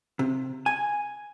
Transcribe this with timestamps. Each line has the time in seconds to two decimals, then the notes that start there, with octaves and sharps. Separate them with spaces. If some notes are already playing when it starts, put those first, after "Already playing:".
0.19 C3
0.66 G#5